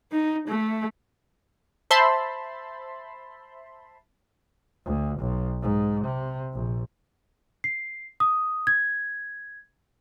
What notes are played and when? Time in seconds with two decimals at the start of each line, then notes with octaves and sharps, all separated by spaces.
0.12 D#4
0.48 A3
1.91 C5 E5 A5 B5 C6
4.86 D2
5.20 B1
5.62 G#2
6.05 C3
6.54 A#1
7.64 C7
8.20 D#6
8.67 G#6